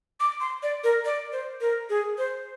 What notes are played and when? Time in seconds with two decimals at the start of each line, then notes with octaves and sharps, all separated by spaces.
0.20 D6
0.40 C6
0.63 D5
0.84 A#4
1.05 D5
1.32 C5
1.61 A#4
1.90 G#4
2.18 C5